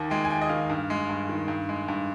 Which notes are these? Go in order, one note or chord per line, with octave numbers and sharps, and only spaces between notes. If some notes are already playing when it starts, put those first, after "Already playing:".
Already playing: D#2 D#3
G#3 G5
G#5
D#2 G5
D#5
D#3 F5
G2
G#3
G2
D#3
G2
G#3
G2